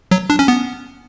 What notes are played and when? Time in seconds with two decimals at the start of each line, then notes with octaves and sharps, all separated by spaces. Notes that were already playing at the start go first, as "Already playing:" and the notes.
0.11 F#3
0.30 D4
0.39 C#4
0.48 B3